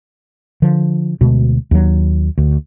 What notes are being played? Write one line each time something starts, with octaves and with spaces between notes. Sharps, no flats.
D3 F3
D2 B2 G#3
D#2 F#3
D2